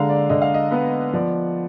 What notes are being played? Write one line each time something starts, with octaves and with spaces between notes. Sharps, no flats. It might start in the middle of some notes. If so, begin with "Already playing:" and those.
Already playing: D3 G#3 F5 A#5
D5
D3 D#5
F5
D#5
B3 B4
F3 D5